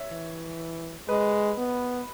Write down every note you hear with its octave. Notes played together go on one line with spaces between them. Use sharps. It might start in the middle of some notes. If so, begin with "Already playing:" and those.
Already playing: C#5 E5
E3
G#3 B4 D#5
B3